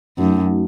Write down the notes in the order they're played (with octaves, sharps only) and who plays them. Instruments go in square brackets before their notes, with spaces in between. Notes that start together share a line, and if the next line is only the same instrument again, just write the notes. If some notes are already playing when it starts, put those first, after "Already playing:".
[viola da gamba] F#2 [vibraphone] A3 D#4 F#4